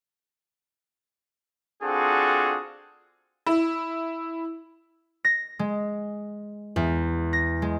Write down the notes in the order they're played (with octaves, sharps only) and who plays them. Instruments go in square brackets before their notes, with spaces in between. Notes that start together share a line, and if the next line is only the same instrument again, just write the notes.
[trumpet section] C4 D4 F4 F#4 G#4 A4
[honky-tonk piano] E4
[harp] A#6
G#3
E2
A#6
G#3